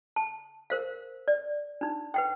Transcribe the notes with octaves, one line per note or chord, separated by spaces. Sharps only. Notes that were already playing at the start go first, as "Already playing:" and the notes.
A5
A#4 C5 F5
D5
D4 D#4
B4 F#5 G5